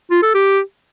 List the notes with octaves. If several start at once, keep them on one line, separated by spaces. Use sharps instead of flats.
F4
A4
G4